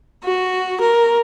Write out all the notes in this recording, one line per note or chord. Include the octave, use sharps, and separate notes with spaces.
F#4
A#4